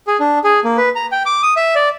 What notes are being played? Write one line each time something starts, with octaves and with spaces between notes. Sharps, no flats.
G#4
D4
G#4
A#3
B4
A#5
G5
D6
D#6
E5
D5